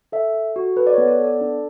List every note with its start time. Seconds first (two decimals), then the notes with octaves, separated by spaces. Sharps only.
0.12 A4 E5
0.35 A4
0.56 F#4
0.76 A4 B4
0.87 D5
0.93 C#5
0.98 B3
1.08 D5
1.19 A4
1.25 D5
1.41 D4